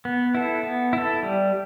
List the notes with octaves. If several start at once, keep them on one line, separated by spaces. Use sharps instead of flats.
B3
E4 A4
B3
E4 A4
G3